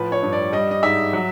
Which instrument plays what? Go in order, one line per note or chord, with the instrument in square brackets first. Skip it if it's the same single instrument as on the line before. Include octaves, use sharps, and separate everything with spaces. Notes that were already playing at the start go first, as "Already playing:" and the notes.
Already playing: [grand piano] A2 F3 B4
C#5
G2
D5
G3 D#5
D#5
G#2 E5
F#3